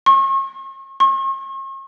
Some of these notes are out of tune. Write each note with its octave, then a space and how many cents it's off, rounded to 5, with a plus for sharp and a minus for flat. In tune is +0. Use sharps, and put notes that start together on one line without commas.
C#6 -40
C#6 -45